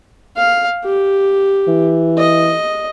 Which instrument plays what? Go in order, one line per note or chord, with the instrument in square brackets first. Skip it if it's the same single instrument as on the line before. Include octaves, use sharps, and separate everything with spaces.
[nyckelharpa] F5
G4
[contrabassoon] E3
[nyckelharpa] D#5